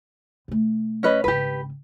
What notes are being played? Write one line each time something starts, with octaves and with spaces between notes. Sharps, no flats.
B2 A3
C#4 B4 D#5
G#1 C#3 G4 B4